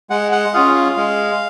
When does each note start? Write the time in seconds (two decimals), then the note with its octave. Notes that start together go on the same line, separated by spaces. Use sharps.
0.10 G#3 F#5
0.32 F#5
0.53 C#4 F4 G#4 F5
0.75 F5
0.97 G#3